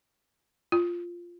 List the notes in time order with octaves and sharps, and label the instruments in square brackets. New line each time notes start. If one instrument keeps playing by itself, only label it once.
[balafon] F4